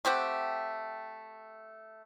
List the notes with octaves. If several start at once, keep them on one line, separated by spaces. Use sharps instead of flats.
A3 C4 G4 F#5